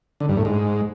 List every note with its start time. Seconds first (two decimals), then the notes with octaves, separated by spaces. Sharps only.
0.20 D3
0.29 G2
0.37 A2
0.45 G#2